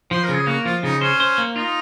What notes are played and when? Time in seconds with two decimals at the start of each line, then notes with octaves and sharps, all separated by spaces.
0.11 F3 C5
0.24 A#4
0.29 C#3
0.35 G#4
0.47 A#3 F#4
0.65 F3 F4
0.83 C#3 D#4
1.01 C#4 C5
1.20 C5
1.38 A#3
1.56 D#4 F4